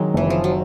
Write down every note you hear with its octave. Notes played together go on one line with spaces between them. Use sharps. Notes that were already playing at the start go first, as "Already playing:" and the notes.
Already playing: D#3 F#3 G#3
F#1 E3
F3
F#3